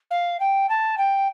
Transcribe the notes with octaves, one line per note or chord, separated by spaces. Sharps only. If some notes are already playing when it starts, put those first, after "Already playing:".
F5
G5
A5
G5